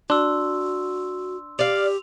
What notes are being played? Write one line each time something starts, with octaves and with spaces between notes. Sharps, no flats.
D4 F#4 C6 E6
G4 D5 F5 F7